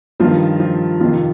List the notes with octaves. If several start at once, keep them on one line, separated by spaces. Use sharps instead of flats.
G2 D#3 F3 F4
F3 F4
F2 C3 D#3 F3 F4